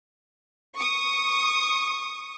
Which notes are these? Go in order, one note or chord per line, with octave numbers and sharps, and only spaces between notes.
C#6 D#6